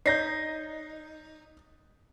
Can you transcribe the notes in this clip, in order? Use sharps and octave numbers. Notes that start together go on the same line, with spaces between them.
D#4 C#5 D5 G6 A#6 C7